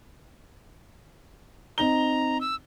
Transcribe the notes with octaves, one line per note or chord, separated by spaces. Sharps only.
C4 D#4 A#5 G7
E6